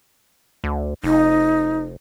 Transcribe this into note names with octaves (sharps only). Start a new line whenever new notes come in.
D2
F1 D#4